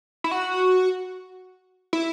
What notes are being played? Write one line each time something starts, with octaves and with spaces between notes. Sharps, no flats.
E4
F#4
E4